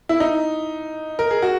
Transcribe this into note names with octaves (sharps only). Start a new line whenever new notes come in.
E4
D#4
A#4
G#4
F#4